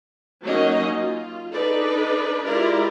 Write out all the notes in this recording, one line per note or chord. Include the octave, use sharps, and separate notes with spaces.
F#3 A#3 C#4 D#4 F#4 D#5
F4
D4 D#4 A4 B4 D5
G#3 E4 F4 G4 A#4 D5